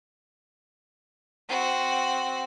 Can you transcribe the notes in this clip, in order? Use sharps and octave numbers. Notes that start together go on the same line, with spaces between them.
C4 F#4